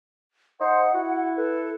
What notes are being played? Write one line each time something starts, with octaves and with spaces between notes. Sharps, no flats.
D#4 C5 F#5
E4 F#4
A4 B4